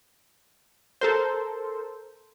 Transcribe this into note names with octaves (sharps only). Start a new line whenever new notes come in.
A4 A#4 C5